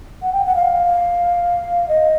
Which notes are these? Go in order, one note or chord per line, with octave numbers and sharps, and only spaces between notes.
F#5
G5
F#5
F5
D#5